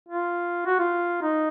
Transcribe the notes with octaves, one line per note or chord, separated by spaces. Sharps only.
F4
F#4
F4
D#4